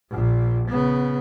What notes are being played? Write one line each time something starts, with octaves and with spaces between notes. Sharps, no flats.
A#1 A#2
C#3 B3